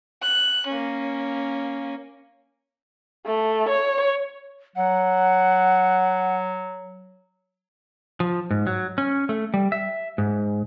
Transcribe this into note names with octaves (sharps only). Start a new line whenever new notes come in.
F#6
A#3 C#4
A3
C#5
F#3 F#5
F3
G#2
F#3
C#4
A3
G3
E5
G#2